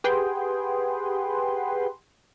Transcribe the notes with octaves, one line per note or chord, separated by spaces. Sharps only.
G4 G#4 B4 F#5 G5 C6